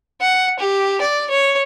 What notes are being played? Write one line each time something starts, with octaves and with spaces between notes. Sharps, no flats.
F#5
G4
D5
C#5